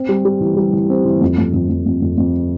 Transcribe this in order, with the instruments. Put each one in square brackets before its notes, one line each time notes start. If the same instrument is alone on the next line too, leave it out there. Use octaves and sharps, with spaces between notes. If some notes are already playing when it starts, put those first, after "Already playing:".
Already playing: [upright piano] C4
G3
G3
E3
G3
E3
C4
E3
F2
F2
F2
F2
F2
F2
F2